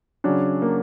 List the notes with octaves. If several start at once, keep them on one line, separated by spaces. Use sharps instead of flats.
C#3 F#3 C#4 D4
A#3